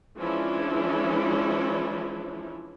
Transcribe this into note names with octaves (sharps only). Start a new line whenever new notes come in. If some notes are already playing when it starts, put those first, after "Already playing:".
E3 F3 G#3 C#4 D4 E4